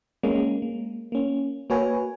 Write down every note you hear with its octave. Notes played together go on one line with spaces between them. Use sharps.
G#3 A#3 C#4
A#3
A#3 C#4
A#3 F#4 B4 C#5 G#5